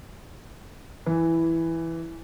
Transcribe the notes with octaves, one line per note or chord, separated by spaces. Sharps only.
E3